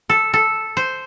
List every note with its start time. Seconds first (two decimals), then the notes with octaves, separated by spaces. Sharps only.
0.09 A4
0.34 A4
0.77 C5